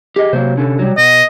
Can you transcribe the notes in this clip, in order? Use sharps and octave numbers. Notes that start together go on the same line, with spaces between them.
G4 G#4 D#5
C3 F#3 A#3 C5
D3 C#4 A4
F#3 G3
B2 D#5